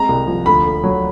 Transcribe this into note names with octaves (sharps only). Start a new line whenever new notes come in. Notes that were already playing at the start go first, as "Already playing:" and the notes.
Already playing: G#3 C4 A#5
C2
F3
D2 B5
D2
F#3